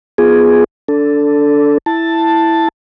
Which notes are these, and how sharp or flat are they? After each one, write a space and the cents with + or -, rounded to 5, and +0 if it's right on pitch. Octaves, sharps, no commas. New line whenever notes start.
B3 +0 F4 +0 G#4 +0
D4 -20 A4 +5
E4 +0 A5 +5